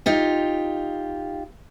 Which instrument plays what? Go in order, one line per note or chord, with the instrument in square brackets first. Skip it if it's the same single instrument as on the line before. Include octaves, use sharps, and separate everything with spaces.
[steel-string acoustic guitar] D#4 F4 G4